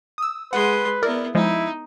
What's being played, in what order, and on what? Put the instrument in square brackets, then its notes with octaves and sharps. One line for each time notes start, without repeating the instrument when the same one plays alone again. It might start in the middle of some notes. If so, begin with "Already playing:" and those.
[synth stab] D#6 E6
[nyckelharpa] G#3 C6 [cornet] B4 [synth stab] F#5
[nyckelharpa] B3 E4 [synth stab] A#4 D5
[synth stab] F3 G#3 [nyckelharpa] D#4 [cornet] E4